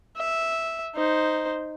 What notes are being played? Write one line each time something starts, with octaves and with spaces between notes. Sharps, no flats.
E5
D#4 C5